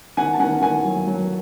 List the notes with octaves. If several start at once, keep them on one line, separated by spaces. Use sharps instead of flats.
D#3 F#5 G#5
A5
D#3 F#5 G#5
D#3 F#5 G#5
F#3
F#3